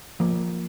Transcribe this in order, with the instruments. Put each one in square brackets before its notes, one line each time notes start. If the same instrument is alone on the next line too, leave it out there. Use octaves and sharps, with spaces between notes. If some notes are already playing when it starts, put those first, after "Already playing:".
[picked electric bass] F3 A#3